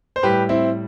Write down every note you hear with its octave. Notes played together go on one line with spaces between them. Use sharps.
C5
A2 G3 G4 B4
C4 E4